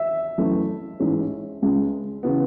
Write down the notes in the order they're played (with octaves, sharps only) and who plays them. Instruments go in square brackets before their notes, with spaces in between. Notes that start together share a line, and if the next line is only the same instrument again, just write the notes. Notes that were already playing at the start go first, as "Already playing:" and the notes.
Already playing: [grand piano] E5
[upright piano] F#2 E3 A3 E4
A1 G#2 E3 G#3 C#4
C#2 C#3 G#3
C#3 E3 B3